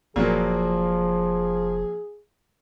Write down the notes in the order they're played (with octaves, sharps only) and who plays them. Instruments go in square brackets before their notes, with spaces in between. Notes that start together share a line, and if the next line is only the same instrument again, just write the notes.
[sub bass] F1 [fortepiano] A#2 F#3 A#3 [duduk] F3 [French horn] G#4